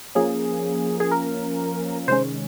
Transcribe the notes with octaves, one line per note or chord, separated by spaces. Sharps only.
F3 A#3 C#4 G#4
G#4
A#4
C3 D#3 G#3 C#4 C5